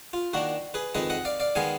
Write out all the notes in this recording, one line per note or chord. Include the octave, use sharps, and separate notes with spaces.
F4
D#3 A#3 D4 F#4
G#4 B4
F2 D#3 G#3 B4 D#5
D#5 F#5
D5 F5
D5 F5
D#3 G#3 B3 F5 G#5